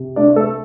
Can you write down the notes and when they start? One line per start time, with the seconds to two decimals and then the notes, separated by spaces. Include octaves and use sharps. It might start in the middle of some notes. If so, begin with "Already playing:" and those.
Already playing: C3
0.16 A3 D4 D5
0.36 A3 A4